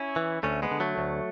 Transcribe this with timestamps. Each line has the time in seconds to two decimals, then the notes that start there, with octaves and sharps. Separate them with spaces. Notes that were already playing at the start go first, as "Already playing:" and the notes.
Already playing: C#4 E4
0.16 E3
0.43 D2 A3 C#4
0.62 G#3 B3
0.71 D3
0.80 F#3 A3
0.98 D2